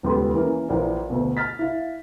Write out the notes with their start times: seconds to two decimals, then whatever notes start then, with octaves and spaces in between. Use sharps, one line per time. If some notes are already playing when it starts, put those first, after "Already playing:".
0.03 D#1 C#2 B3 G4 A4 C6
0.34 E3 A#3 C#4 A#4
0.69 A#1 E3 A#4 D5
1.10 D2 B2
1.37 F6 A6 B6
1.59 E4 F5